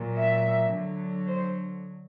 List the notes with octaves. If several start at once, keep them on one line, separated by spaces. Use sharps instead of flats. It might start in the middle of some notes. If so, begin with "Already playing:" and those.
Already playing: A#2 F#3
E5
D3 F#3
C5